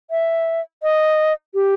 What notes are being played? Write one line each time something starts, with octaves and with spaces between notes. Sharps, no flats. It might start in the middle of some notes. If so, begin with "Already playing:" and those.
E5
D#5
G4